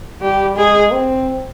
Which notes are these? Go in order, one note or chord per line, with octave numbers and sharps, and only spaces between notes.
G3 G4
G#3 G#4
C4